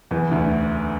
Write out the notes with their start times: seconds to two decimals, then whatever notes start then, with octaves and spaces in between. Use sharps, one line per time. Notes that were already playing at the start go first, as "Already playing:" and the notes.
0.11 E2 E3
0.31 D2 D3